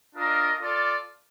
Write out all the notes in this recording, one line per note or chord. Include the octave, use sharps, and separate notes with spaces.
D4 F4 A#4 D#5
F4 A4 D5